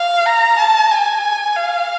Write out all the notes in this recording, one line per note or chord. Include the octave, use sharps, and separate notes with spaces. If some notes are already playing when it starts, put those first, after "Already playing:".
Already playing: F5
A#5
A5
G#5
F5